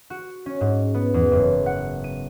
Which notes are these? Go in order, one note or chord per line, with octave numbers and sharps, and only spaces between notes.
F#4
C#4
G#2
B3
E2
F#1
F#5
D#7